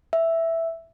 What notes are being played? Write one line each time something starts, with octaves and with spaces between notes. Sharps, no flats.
E5